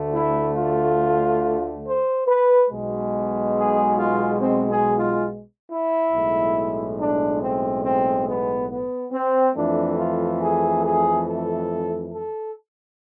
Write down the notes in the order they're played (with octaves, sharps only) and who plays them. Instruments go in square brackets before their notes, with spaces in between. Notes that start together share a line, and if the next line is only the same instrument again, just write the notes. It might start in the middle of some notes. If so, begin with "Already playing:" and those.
Already playing: [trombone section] D2 D3 A3
E4
F4
C5
B4
B1 B2 G#3
G#4
F4
C4
G#4
F4
E4
B1 A2 G#3
D4
C4
C4
B3
B3
C4
F2 E3 A3 D4
F4
G#4
G#4
A4
A4